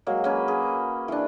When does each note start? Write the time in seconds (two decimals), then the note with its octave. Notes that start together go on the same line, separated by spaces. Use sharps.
0.07 F#3 G#3 A#3
0.24 A#3 C#4 B4
0.48 G#4
1.08 E3 D4